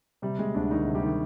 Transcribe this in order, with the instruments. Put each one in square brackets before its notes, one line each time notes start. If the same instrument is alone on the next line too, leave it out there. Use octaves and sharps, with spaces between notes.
[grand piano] C3 G3
C3 G#3
D2 D3 D4
D2 D#3 D#4
C3
G3 G4
D#3